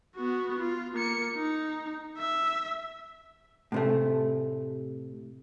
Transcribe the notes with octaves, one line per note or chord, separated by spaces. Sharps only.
B3 F#4
F4
A#3 C#7
D#4
E5
A2 C3 A3